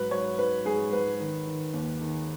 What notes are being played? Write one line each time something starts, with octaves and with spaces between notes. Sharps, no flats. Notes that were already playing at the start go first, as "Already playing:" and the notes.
Already playing: G#2 F#3 B4
F#3 C#5
F#3 B4
G#2 G#4
G#2 B4
D#3
D#3
D#2
D#3